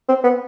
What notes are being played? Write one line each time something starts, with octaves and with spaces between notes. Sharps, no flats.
C4
B3